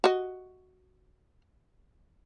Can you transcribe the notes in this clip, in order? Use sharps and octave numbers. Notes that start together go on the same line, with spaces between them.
F#4 D#5